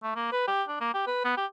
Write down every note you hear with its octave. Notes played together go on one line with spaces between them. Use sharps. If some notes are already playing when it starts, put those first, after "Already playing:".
A3
A#3
B4
G4
D4
A#3
G4
B4
B3
G4